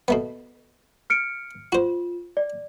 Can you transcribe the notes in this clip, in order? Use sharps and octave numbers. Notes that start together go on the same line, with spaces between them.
B2 A3 B3
F6 C#7 D7
F4 F#4 C5
D5